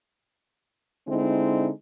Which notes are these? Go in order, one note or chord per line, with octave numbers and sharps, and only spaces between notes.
D3 G#3 C4 D#4 E4